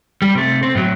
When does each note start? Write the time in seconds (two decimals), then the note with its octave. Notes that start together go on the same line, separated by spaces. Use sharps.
0.22 G3
0.35 C3 A3
0.63 C4
0.75 A2 F#3